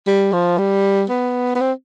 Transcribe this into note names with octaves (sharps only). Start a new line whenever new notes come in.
G3
F3
G3
B3
B3
C4